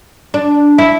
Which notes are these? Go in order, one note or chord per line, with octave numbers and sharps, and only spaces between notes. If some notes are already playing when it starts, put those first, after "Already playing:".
D4
E4